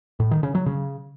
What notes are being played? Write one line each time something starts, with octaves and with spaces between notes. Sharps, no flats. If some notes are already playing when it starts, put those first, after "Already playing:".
A2
D#3
C#3
F#3
C#3